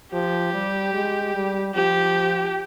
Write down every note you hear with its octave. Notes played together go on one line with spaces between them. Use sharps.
F3 G4
G3
G#3
G3
F3 G4